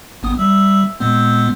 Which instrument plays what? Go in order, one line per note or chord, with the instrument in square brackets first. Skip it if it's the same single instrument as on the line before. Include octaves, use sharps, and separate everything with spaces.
[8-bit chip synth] G#1 B3 D#6
[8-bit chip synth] G3 [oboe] E5
[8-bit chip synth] A#2 G#3 B3 [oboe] C4